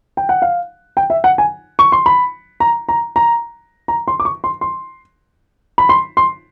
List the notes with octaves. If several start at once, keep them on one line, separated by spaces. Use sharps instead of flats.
G5
F#5
F5
G5
E5
F#5
G#5
C#6
C6
B5
A#5
A#5
A#5
A#5
C6
D6
C#6
C6
C6
B5
C6
C6